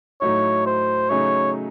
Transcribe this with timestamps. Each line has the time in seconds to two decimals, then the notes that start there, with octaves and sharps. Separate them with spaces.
0.21 A2 F#3 A3 D#4 F#4 C#5
0.66 C5
1.10 C#3 F#3 A3 D#4 G#4 C#5